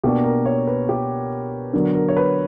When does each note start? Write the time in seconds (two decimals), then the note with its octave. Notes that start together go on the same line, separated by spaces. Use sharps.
0.03 B2 A#3 D4 G4
0.24 A#4
0.46 C#5
0.67 B4
0.89 G4
1.73 D3 F#3 B3 D4 A#4
1.95 A#4
2.08 C#5
2.17 B4